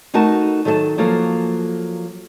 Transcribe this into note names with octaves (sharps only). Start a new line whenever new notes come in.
A3 D#4 F#4 A#4 A5
D#3 F#3 A4 D#5 A5
F3 F#3 A#3 A4